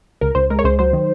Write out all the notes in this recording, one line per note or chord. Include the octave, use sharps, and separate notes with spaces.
C#2 A#4
C#2 C5
G#3 A#4
C#5
C#2 C5
F#3 C5
D#3